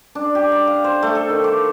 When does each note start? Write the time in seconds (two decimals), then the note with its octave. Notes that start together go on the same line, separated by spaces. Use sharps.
0.15 D4
0.35 G4
0.52 A#5
0.67 F5
0.84 C5
1.02 A3
1.15 A4
1.29 D#3
1.44 D6